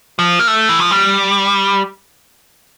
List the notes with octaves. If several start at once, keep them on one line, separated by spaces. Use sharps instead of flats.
F3
A#3
A3
E3
F3
G3